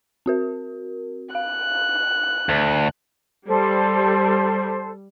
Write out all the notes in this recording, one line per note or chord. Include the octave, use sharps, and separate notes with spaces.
C4 F#4 A#4
F5 F#6
D2
G3 A4 C5